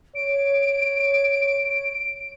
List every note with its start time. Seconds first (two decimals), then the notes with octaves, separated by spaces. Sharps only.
0.15 C#5 D7